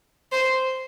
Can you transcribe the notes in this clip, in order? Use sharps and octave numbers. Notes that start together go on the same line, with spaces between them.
C5